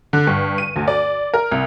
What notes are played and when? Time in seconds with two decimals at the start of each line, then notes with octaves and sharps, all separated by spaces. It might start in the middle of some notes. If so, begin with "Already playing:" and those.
0.13 D3
0.27 G2
0.58 D#7
0.76 D2
0.88 D5
1.34 A#4
1.52 C2